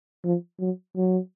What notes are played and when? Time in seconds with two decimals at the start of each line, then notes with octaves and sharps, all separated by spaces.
0.24 F3
0.60 F#3
0.96 F#3